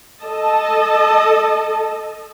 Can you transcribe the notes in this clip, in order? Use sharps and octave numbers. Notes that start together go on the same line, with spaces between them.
A4 D#5 A5